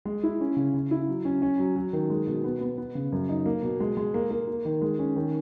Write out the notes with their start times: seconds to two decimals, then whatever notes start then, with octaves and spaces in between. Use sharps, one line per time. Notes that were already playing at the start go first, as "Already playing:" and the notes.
0.05 G#3
0.23 E4
0.41 C#4
0.57 C#3
0.74 C#3
0.91 E4
1.08 F#3
1.25 C#4
1.42 C#4
1.59 F#3
1.76 F#3
1.93 D#3
2.10 G#3
2.27 B2
2.44 B3
2.61 B3
2.78 B3
2.95 C#3
3.12 F#2
3.29 D#4
3.46 A#3
3.63 B2
3.80 G#3
3.97 G#3
4.14 A#3
4.31 A#3
4.47 A#3
4.65 D#3
4.82 G#3
4.99 C#4
5.16 D#3